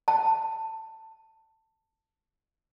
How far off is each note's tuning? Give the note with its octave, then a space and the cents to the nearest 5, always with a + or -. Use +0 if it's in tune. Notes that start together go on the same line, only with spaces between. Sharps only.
A5 +15